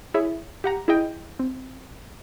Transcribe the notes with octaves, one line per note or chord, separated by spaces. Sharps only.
E4 G#4 C#5 E5
G4 F#5 A#5
E4 G#4 D#5 G5
C4